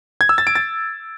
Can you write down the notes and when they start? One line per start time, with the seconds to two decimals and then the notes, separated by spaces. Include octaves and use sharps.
0.21 G#6
0.29 E6
0.38 A6
0.47 D7
0.55 A6